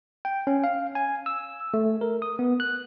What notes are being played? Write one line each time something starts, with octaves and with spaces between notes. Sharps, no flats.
G5
C#4
F5
G#5
E6
A3
A#4
D#6
B3
F#6